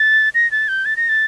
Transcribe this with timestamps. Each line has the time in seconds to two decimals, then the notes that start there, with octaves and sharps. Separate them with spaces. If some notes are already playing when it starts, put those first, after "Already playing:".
Already playing: A6
0.35 A#6
0.51 A6
0.68 G6
0.85 A6
0.97 A#6
1.09 A6